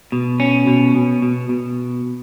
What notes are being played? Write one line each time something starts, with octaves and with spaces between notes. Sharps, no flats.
B2
C#4
B2
B2
B2
B2